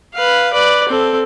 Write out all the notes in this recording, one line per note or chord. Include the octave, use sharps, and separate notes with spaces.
B4 F5
B4 D5
C4 A4